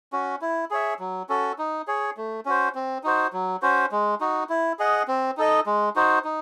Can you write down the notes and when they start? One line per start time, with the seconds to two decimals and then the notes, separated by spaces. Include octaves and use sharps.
0.13 C#4 F#4
0.42 E4
0.71 G#4 C#5 E5
0.99 F#3
1.29 C#4 F#4 A4
1.58 D#4
1.87 G#4 C#5
2.17 A3
2.45 C#4 F#4 C5
2.75 C4
3.03 D#4 F#4 C5
3.33 F#3
3.62 C#4 F#4 C5
3.92 G#3
4.21 D#4 F#4
4.49 E4
4.79 G#4 D#5 F#5
5.08 C4
5.37 D#4 A4 D#5
5.66 G#3
5.96 D#4 F#4 C5
6.24 D#4